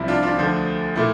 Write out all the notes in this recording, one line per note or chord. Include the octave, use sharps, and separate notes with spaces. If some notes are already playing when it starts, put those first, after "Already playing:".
Already playing: C2 C3 F3 E4
D4 F4
D4 F4
D2 D3 F3 A3
A#2 A3 E4